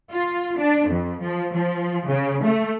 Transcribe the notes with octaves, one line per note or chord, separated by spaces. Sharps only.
F4
D4
F2
F3
F3
C#3
A3